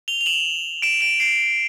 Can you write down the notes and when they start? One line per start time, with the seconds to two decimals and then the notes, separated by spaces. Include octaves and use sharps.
0.08 F7 G7
0.21 F7
0.26 E7 F#7
0.82 D7 E7
1.01 D7 E7
1.20 C7 D7